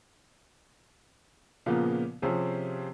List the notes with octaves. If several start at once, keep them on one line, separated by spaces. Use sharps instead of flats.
A#2 C#3 F3 A#3 B3
C3 F3 C4 C#4 G4 G#4